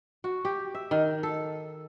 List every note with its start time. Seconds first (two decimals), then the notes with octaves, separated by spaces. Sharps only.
0.24 F#4
0.45 G4
0.74 E5
0.91 D#3
1.23 A4